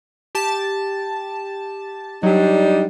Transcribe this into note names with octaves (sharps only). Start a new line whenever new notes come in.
G4 A5
F#3 G3 D4 D#4